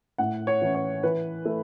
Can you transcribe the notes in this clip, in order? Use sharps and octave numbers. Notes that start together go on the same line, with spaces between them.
A2 F#5
C#5
E3 C#4
C#5
E3 B4
A3 E4